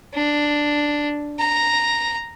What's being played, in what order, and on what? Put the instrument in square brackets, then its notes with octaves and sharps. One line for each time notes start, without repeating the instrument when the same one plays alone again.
[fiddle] D4
A#5